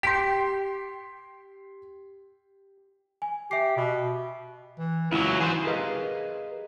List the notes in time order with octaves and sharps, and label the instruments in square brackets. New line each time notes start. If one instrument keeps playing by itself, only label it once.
[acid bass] G4 [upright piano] C6 B6
[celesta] G#5
[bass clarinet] G4 [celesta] E5 C7
[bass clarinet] B2
E3
[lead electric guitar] C#2 F#3 [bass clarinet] E4
[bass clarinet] E3 [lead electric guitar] G#4 C5
[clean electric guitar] G4 G#4 A#4 B4 D#5 F5